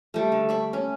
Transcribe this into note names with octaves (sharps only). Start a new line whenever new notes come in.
G3 A3
D3
D5 B5 C#6
C#4